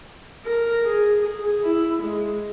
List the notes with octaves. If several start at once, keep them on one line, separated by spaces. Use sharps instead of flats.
A#4
G#4
G#4
E4
G#3